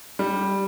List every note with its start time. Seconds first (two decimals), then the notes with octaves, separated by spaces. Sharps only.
0.19 G3